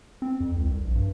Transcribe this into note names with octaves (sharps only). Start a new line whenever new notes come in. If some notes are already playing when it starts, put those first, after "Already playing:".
C4
F2
C#2
C2
A#1
G2